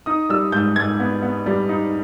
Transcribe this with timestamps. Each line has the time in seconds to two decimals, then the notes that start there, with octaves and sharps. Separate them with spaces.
0.06 D#4 D#6
0.29 G3 E6
0.52 G#2 G6
0.76 G#2 G#6
1.00 B3
1.22 B3
1.46 G3
1.69 D#4